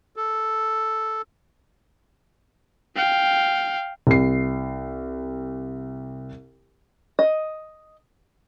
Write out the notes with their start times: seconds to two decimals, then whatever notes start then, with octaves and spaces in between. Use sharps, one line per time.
0.16 A4
2.96 F5 G5
4.07 C2 C7
7.19 D#5